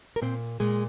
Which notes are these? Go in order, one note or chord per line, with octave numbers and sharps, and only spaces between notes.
A#4
A#2 C4 C5
A#2 G#3 G#4